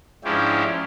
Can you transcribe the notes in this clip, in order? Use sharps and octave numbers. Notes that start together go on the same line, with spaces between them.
G#2 F3 C#4 D4 E4 G4